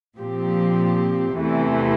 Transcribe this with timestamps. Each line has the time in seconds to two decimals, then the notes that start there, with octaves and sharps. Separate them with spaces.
0.18 A#2 F3 C4 G4
1.34 E2 C3 E3 A3